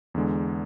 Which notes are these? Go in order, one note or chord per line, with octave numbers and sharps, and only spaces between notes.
E2 D3 G#3